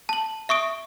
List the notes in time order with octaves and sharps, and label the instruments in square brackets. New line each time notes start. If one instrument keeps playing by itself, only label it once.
[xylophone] A5 F#7
E5 C#6 D#6 D7